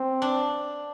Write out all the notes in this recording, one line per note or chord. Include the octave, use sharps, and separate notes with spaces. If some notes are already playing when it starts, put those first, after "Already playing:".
Already playing: C4
D4